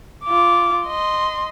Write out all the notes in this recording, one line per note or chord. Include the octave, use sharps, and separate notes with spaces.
F4 D6
D#5 C6